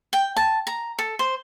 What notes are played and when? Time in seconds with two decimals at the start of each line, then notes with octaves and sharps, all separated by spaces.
0.13 G5
0.37 A5
0.67 A#5
0.99 A4
1.19 C5